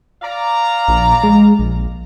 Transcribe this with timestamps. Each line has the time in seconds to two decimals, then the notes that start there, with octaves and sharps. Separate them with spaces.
0.22 D5 F5 A#5
0.88 A#1
1.23 G#3
1.59 A#1